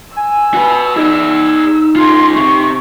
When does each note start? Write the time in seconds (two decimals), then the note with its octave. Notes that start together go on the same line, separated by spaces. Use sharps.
0.16 G#5 E6
0.54 F#4 B4
0.97 D#4 G#4 D5
1.96 F4 G#4 C6
2.36 C3 C4 C#6